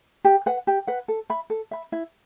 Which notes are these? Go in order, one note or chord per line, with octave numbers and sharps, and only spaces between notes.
G4
B4 F#5
G4
B4 F#5
A4
E5 B5
A4
E5 B5
E4